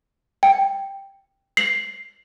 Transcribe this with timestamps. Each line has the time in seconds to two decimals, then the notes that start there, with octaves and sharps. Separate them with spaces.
0.43 G5
1.57 C7